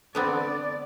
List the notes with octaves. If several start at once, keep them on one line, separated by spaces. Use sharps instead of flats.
D3 B3 C4 D5